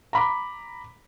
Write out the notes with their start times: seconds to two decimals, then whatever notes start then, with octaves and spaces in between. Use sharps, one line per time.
0.13 A#5 B5 D6